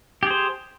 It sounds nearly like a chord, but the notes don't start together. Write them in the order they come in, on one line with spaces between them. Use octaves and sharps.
G4 G#4 C5